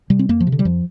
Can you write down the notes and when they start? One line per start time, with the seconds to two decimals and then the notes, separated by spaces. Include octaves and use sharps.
0.10 C3 G3
0.19 C4
0.29 F2 A#3
0.40 F3
0.47 C3
0.52 D3
0.59 G3
0.65 F2 F3